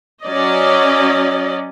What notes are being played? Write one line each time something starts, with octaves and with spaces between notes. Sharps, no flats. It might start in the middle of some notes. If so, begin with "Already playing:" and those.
F#3 C#4 D5 D#5